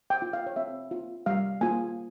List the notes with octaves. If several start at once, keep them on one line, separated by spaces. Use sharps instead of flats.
G5
F4
F5
C#5
C4 E5
F4
G3 F5
A#3 F4 G#5